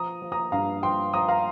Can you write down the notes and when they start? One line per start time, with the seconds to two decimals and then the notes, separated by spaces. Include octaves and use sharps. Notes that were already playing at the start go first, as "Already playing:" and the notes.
Already playing: F3 A#5 D#6
0.22 F3
0.32 A#5 D#6
0.52 G2 F5 A#5
0.83 F3 G5 C6
1.13 F3 A#5 D#6
1.28 F5 A#5